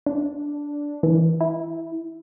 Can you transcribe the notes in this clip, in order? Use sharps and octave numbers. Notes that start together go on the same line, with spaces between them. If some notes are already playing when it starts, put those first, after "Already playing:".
D4
E3
E4